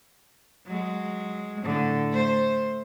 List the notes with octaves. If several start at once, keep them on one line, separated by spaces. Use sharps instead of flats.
F#3 G#3
A2 D3
A3 C5